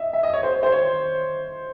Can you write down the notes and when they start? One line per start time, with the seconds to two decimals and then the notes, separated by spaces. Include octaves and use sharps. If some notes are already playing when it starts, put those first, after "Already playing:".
Already playing: D#5 E5
0.13 E5
0.23 D#5
0.33 C#5
0.43 C5
0.63 C5
0.72 C#5